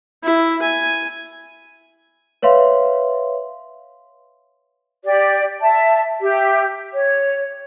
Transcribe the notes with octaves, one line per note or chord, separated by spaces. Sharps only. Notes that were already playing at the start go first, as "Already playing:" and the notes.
E4
G#5
B4 C#5 E5 F5 C6
G4 D5
E5 A5
G4 E5
C#5